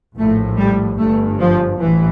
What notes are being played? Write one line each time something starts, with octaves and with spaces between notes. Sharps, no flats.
A#1 A2 A3
G3
G1 G2 A3
F3
A1 E3